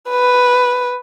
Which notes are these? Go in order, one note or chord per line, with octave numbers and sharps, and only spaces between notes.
B4